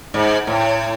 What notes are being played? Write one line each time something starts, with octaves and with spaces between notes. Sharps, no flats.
G#2
A2